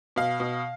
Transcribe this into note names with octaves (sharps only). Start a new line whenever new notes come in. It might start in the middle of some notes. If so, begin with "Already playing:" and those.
B2 F5
B2